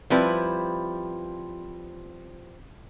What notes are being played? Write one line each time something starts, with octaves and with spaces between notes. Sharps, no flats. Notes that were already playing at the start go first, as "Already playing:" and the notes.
F3 G3 C4 E4 B4